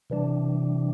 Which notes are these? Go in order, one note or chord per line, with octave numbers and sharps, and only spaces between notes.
C3 E3 G3 D4